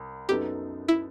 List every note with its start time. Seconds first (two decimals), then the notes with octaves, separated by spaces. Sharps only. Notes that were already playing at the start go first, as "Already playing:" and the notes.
Already playing: C2
0.29 F#2 F#3 B3 D#4 G4 A4
0.88 E4